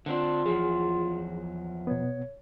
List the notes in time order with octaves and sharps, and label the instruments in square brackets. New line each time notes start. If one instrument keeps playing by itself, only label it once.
[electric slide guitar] D3 C4 D4 [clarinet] F4
[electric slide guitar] E2 F3 F#3 [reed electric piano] G#4
[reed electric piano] B2 B3 [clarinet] C#5